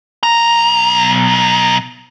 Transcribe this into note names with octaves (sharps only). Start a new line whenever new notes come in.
B1 A#5